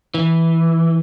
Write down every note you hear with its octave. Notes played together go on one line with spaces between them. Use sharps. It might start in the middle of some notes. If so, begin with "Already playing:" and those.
E3